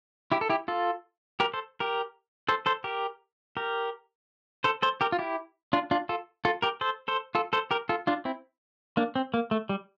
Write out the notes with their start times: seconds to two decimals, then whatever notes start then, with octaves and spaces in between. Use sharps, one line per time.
0.32 E4 G4
0.41 A4
0.50 E4 G4
0.68 F4 A4
1.40 G4 A#4
1.54 A4 C5
1.80 G4 A#4
2.49 A4 C5
2.66 A4 C5
2.84 G4 A#4
3.57 G4 A#4
4.64 A4 C5
4.82 A4 C5
5.01 G4 A#4
5.12 F4
5.19 E4 G4
5.73 D4 F4
5.91 D4 F4
6.09 F4 A4
6.45 F4 A4
6.62 G4 A#4
6.81 A4 C5
7.08 A4 C5
7.35 F4 A4
7.53 A4 C5
7.71 G4 A#4
7.89 F4 A4
8.07 D4 F4
8.25 C4 E4
8.97 A#3 D4
9.16 C4
9.34 A#3
9.51 A3
9.69 G3